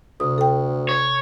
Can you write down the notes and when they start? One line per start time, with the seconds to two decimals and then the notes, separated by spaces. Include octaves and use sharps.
0.20 D2 C3 D#6
0.38 A4 G5
0.89 C#5